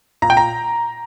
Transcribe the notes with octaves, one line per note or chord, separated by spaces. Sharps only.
A#2 A#5
G5
A#5